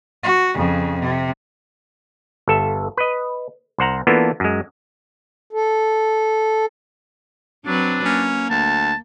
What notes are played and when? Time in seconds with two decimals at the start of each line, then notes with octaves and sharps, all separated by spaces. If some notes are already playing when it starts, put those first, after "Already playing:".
0.23 F#4
0.55 F2 C#3
0.99 C3
2.48 G1 A4 E5
2.97 B4 D#5
3.78 C2 C5 F#5 A#5
4.07 E3 A#3 B3 D4 F4 A4
4.40 F#2 G#3
5.53 A4
7.66 F#3 C4 D4 B4
8.05 A#3 C#4
8.50 D2 A5